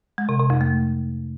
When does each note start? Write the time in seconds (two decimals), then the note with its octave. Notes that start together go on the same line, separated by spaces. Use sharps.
0.18 G#3
0.29 C3
0.39 C3
0.50 F2
0.61 A3